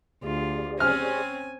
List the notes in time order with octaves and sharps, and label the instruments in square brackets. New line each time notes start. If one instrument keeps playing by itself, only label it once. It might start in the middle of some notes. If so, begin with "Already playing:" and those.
[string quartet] D2 F4 [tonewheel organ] G4 G#4 D5
[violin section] C4 C#4 [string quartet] G#5 [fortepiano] F6